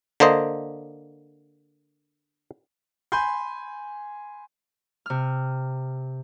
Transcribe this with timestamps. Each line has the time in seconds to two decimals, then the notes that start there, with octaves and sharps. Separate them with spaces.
0.20 D3 A#3 C5 D#5
3.12 G#5 B5 C6 G6
5.06 C3 F6